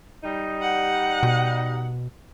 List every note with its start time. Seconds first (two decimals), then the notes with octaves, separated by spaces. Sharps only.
0.24 G3 D#4
0.62 F#5
1.23 B2